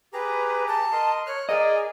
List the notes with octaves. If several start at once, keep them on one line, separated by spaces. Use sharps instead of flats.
G4 G#4 B4 A#5
A5
A#4 D#5 C6
C#5 F6 F#6
G#4 A#4 D5 D#5 A#5